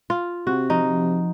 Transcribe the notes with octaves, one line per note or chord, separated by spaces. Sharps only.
F4
C3 F#4
F3 D#4